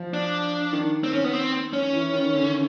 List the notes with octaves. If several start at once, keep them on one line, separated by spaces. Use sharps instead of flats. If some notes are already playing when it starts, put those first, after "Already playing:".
Already playing: F3
D4
D#3
C4
C#4
B3
C4
C#4
E3
D#3
D3